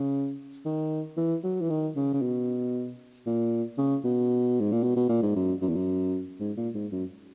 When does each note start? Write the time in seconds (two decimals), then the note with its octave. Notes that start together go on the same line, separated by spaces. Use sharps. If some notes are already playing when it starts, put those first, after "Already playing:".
Already playing: C#3
0.65 D#3
1.17 E3
1.44 F#3
1.61 E3
1.70 D#3
1.96 C#3
2.14 C#3
2.22 B2
3.26 A#2
3.78 C#3
4.05 B2
4.60 G#2
4.72 A#2
4.83 B2
4.96 B2
5.09 A#2
5.22 G#2
5.36 F#2
5.62 F#2
5.69 E2
5.76 F#2
6.40 G#2
6.57 A#2
6.75 G#2
6.92 F#2